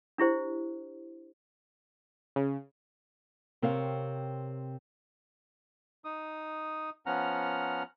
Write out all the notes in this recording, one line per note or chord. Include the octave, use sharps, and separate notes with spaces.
D4 E4 G4 C5
C#3
C3 C4 A#4 C#5 F5
D#4 D#6
F3 B3 C#4 F#5 A#5 F6